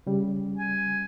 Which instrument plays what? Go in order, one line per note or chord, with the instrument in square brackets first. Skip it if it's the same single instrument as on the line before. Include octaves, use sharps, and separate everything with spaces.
[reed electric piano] C#3 G3
[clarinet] G#5